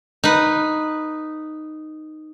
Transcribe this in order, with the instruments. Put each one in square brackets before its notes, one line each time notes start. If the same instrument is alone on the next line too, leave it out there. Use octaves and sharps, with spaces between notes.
[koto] D#4 B4